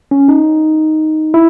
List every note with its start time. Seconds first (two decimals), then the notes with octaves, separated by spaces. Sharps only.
0.11 C#4
0.28 D#4
1.34 E4